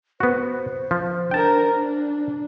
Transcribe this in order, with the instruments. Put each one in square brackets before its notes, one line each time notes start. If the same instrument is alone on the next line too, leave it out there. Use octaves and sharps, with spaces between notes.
[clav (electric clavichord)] B3 F#4 [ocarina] C5
[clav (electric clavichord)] F3
[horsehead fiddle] D4 A#4 [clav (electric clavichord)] G5 A5
[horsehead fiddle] D4